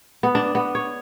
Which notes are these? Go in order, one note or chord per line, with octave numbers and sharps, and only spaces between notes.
B3
D4
B3
C#5